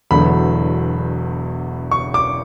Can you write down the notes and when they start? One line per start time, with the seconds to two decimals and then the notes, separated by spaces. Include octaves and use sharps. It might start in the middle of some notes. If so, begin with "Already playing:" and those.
0.11 E1 E2 D3 F#3 A3 B5
1.91 C#6
2.14 D6